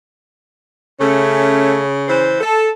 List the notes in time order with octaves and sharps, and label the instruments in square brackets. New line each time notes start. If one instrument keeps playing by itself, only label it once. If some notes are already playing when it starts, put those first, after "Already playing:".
[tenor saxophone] C#3 [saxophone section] A3 C#4
[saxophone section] E3 E4 C5
A4